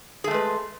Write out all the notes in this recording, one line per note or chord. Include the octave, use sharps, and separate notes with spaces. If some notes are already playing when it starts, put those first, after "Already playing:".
G#3 A3 G#4 B4